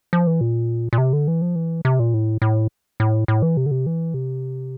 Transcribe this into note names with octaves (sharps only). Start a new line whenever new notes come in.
F3
E3
A#2
A#2
C3
D3
E3
F3
E3
C3
A#2
A2
A2
A2
A2
E3
C3
D3
C3
E3
C3